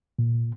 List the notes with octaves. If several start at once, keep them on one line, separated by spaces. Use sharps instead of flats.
A#2